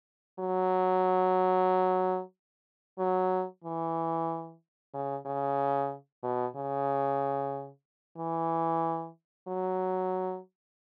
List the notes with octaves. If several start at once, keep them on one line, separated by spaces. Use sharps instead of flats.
F#3
F#3
E3
C#3
C#3
B2
C#3
E3
F#3